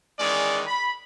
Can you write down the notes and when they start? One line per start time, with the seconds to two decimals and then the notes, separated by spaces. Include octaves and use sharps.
0.19 D#3 E3 G#3 C#4 G#4 D5
0.67 B5